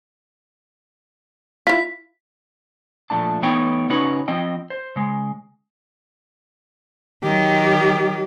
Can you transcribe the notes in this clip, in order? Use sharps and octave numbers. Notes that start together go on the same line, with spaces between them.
E4 F4 B6
A#2 F3 A3 D4 A5
E3 A3 B3 D#4 C#5 G5
C#3 C#4 D#4 F#4 B4 C#5
F3 C4 D#5 G5
C5
C#3 G#3
D#3 F#3 G4